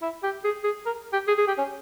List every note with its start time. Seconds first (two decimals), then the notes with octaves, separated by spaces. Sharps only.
0.02 E4
0.23 G4
0.44 G#4
0.63 G#4
0.86 A#4
1.13 G4
1.27 G#4
1.38 G#4
1.47 G4
1.58 C#4